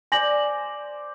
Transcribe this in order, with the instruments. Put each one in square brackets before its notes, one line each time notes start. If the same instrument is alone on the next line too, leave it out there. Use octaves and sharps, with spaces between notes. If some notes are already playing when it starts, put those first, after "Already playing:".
[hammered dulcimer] C5 D5 [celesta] G#5 A#6 F#7